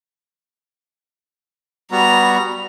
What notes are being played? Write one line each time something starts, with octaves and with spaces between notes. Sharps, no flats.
G3 B3 F#4 A#5 F7